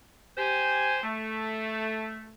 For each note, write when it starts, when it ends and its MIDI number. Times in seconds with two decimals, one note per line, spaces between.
0.38 0.99 67
0.38 0.99 72
0.38 0.99 80
1.03 2.34 57